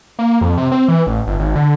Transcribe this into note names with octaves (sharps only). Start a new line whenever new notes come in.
A#3
F2
C3
C4
E3
A1
G1
G#1
D3